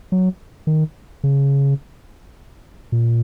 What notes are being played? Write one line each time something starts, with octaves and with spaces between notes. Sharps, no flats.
F#3
D#3
C#3
A#2